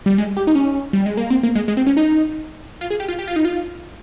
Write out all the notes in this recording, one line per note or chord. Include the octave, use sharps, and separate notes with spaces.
G3
G#3
G4
D#4
C#4
G3
G#3
A#3
C4
A#3
G#3
G#3
C4
C#4
D#4
F4
G#4
G4
F4
G4
F4
D#4
F4